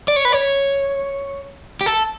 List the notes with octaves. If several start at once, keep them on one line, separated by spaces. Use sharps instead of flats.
D5
C#5
B4
C#5
G4
A4